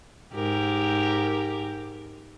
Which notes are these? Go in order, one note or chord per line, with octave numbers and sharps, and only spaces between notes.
G#2 G4 A#4